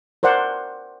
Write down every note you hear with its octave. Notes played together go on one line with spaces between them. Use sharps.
A#4 C5 D5 F#5